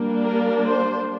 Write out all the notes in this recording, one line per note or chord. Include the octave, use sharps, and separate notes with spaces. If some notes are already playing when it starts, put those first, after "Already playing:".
Already playing: G3 A#3 D4
A#4
C5